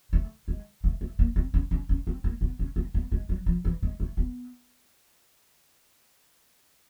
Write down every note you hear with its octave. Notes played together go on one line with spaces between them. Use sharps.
A3
G#3
A3
A3
A#3
C4
C#4
C#4
C#4
C4
A#3
B3
C#4
C4
B3
G#3
F#3
F3
E3
G#3
A3
B3